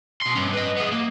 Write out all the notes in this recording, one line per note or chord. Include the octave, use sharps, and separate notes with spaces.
B2 C6
G2 C#4
B4 D#5
B3 G#4
A#3